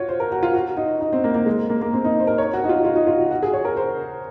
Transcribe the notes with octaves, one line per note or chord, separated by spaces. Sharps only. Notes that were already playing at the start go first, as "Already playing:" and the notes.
Already playing: F4 F#4 C#5
C5
A#4
F#4
F4
F#4
D#4
D#4
C4
A#3
A#3
G#3
A#3
A#3
C4
D#4
C5
A#4
C#5
F#4
D#4
F4
F4
D#4
F4
F#4
F#4
G#4
C#5
A#4
C5